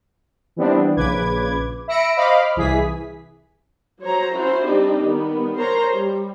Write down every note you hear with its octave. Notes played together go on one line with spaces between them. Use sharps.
E3 G3 B3 C4 D4
A#1 C#3 B4 D6 G#6
E5 B5 E6 A#6 C#7 D7
C5 D#5 F5 B5 D6 F6
C2 E3 G#4 B6
F#3 C5 C#5 A#5
C#4 E4 F#4 C5
G3 C4 D4 D#4 G4
D#3 G3 B3
A#4 C5 C#5 A#5 C6
G3